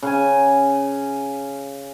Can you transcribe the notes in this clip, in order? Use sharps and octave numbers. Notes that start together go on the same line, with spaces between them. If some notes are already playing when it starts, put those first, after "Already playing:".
C#3 G#5